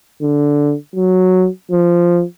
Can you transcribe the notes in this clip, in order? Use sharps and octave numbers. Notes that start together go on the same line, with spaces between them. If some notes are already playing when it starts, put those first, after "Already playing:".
D3
F#3
F3